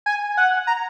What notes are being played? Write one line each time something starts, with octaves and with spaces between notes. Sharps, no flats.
G#5
F#5
A#5